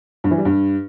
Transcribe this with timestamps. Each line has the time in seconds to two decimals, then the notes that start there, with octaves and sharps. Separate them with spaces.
0.24 G2
0.31 E3
0.38 G3
0.45 G2